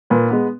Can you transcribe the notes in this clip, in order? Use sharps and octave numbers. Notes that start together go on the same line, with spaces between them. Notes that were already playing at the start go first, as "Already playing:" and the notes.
A#2 B4
G#3 B3